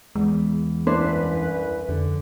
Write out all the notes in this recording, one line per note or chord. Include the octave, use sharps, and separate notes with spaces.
E2 G#3
C2 F#2 D4 E4 B4 C5
F2 D3